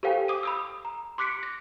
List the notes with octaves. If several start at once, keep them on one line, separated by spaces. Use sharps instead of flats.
G4 A4 C5 F5 G5 G#5
D6 D#6 D#7
B5 D#6 E6
A#5
C6 D6 F#6 B6 C#7 D7
A#6